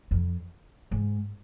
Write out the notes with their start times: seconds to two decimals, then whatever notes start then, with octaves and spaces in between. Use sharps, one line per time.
0.11 F2
0.91 G#2